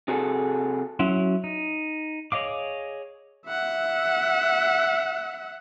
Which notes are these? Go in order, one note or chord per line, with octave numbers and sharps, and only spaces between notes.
C3 F#4 G#4 A4
F#3 C#4 E4 F#4 C6
D#4
G#4 C#5 D#5 F5 D6
E5 F#5